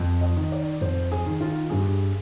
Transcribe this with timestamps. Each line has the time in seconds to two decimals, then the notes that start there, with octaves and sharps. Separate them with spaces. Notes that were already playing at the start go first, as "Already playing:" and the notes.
Already playing: F2
0.21 D#5
0.36 D#3
0.52 D5
0.81 F2 C5
1.12 G#4
1.26 D#3
1.41 F4
1.70 G2 G#4